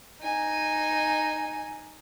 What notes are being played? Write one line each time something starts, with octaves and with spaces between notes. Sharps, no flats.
D#4 G#5